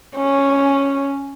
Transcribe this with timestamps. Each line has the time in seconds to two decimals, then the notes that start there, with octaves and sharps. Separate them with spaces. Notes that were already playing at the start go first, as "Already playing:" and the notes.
0.16 C#4